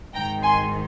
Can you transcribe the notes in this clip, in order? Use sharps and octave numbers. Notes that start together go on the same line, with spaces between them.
G#1 G#2 D#3 G5 A#5
G#5 C6